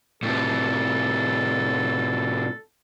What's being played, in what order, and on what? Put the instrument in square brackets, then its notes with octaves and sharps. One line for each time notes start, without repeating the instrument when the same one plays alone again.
[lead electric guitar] A2 C3 [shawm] A4